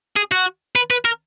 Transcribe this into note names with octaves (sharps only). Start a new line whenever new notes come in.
G#4
F#4
B4
B4
A#4